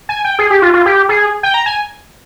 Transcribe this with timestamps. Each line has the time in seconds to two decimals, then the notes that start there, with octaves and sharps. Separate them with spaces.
0.09 G#5
0.24 G5
0.39 G#4
0.50 G4
0.62 F4
0.74 F4
0.86 G4
1.09 G#4
1.43 G5
1.54 A#5
1.66 G#5